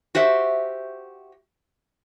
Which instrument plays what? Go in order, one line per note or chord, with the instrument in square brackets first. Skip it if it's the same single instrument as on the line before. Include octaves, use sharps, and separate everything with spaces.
[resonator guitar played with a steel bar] F#4 G4 C5 E5